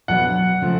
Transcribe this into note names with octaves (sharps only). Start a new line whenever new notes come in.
B2 F#3 B3 D4 F#5
C#3 F3 A3